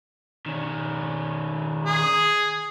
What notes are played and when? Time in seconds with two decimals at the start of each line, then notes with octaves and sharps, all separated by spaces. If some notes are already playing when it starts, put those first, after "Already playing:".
0.46 D#3 C#4
1.85 G#4